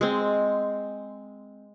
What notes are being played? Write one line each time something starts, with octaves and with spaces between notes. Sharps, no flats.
G#3 C4